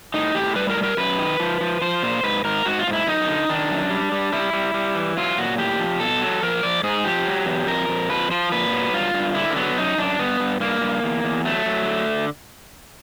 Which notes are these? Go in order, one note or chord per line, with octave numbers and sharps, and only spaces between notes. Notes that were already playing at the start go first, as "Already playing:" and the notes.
A2 D#4
A2 G4
G3 B4
A#4
G3
A#4
F#2 B4
D#3
F3
F3
F3 C5
A#2
G#2 B4
G#2 A#4
G#2 F#4
F4
G#2
E4
F#2 D#4
D3
D#3 D4
F#2
G3
G3
G3 E4
G3
G3
E3
F#3 F4
A#2 F#4
A2 G4
F3
B2 A4
F#3
F3 A#4
F3 D5
G#2 G#4
F3 G4
F#3
E2
F2 A#4
F2
F3 B4
F3 C5
A#2 B4
F#3
G2 F4
G2
D3 E4
A#3
F#3 B3
F#2 D#4
F#2 D4
G2 B3
G2
G2 A#3
G2
E2
E2
F#3 A3
F#3
D3